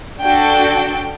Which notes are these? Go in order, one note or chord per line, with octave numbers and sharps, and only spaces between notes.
D4 F#4 A4 G5